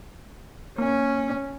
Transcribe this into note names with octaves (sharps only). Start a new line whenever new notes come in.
A#3 C#4